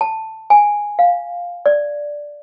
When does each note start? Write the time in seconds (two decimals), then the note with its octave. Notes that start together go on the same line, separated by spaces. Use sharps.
0.01 A5
0.50 G#5
0.99 F5
1.66 D5